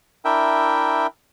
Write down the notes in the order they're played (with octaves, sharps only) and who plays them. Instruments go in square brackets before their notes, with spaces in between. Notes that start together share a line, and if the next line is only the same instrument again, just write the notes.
[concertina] D4 E4 A#4 E5 G5